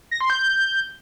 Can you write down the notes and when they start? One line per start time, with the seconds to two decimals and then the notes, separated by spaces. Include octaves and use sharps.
0.11 A#6
0.21 C6
0.30 G6